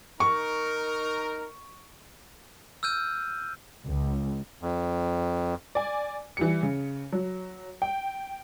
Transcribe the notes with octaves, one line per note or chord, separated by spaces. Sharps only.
D#4 A#4 C#6
E6 F6 G6 D#7
C#2
F2
D5 G#5
E3 G3 C#7
C#3
F#3
G5